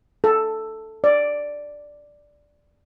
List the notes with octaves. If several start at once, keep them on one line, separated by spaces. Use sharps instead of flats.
A4
D5